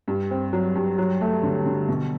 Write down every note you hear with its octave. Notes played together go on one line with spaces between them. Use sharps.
G2
C4
F#3
G2
F#3
A3
D3
D3
B2